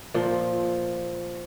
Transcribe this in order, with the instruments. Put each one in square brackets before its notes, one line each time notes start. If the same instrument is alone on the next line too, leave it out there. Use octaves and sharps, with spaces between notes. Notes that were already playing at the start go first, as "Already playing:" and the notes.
[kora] A#2 F3